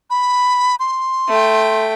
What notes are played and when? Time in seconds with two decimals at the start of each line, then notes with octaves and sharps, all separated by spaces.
0.10 B5
0.80 C6
1.28 A3 G5